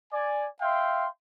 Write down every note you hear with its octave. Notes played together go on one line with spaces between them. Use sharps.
D5 G#5
E5 F5 G5 C6